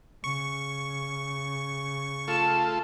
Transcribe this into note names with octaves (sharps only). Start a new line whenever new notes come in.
C#3 C#6
A3 F4 A4 A5